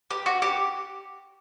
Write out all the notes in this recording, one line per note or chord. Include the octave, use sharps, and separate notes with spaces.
G4
F#4
G4